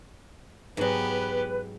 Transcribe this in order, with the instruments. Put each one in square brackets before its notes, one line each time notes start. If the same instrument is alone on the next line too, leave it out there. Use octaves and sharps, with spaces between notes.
[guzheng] G#2 F#3 [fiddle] B3 G4 [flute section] B4